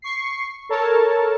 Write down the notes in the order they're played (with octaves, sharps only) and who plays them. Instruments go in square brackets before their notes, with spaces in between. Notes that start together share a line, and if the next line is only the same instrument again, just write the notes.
[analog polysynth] C#6 C7
A4 A#4 C#5 A5